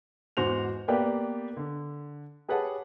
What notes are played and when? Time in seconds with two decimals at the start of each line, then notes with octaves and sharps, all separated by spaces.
0.37 E2 G#2 F#4 C5 F7
0.88 A#3 B3 G4 B4 D5 G5
1.57 D3
2.49 G4 G#4 B4 C#5 F#5 A5